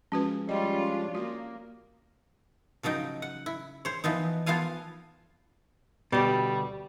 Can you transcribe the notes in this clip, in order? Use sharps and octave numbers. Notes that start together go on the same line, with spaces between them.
F3 G#3 C#4 F#4 B4
G3 C#4 F4 D#5
D4
A#3 F#4
C#3 F3 F#3 D#4 G5
F#5
E4
C5 C#5
E3 F3 B3 D#4
F3 B3 F4 A4 F5 G#5
D2 B2 G3